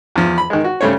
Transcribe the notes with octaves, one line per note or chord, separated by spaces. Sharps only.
E2 F3
B5
D#3 G#3
F#4
C#3 G3 A3 C5 C#5